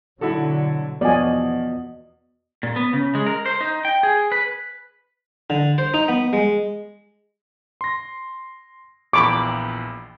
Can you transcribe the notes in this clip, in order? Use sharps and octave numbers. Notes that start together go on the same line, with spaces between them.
B2 D3 F#3 E4 F#4 A4
E2 F3 B3 F#4 D5 D#5 G#5
A#2
B3
C#3
G#3
A#4
C5
D#4
G5
G#4
B4
D3
C5
D#4
B3
G#3
C6 A#6
A#1 E2 A#2 G5 B5 C#6 D6